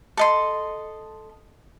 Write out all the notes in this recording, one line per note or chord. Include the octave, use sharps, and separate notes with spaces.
A4 D#5 C6